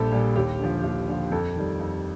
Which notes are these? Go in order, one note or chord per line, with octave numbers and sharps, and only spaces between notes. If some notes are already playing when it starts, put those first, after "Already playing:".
Already playing: A#1 A#2 G3 G4 A4
A#2 G3
D#2 G4
D3 F3
D#2
D3 F3
F2 A4
D#3 G3
F2